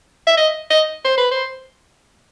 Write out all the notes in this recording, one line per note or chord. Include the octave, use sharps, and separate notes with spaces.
E5
D#5
D#5
C5
B4
C5